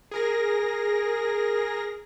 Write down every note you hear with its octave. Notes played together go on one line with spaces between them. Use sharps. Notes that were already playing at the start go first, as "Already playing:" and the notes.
G#4 A#4 A#6